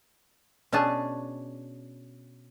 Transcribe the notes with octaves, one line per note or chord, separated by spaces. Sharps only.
B2 C#4 D4 G#4 A5